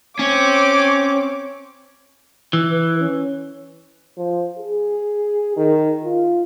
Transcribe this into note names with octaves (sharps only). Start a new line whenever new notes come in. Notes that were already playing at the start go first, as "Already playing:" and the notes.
C4 C#4 C#5 D6
E3
B4
C#4
F3
G#4
D#3
F4